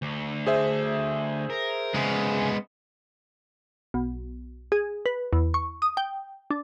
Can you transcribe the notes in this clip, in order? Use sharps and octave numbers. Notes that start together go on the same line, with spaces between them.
D2
G#4 C5 E5
A#4
C#3 G#3 B3
B1
G#4
B4
E2
C#6
D#6
G5
D4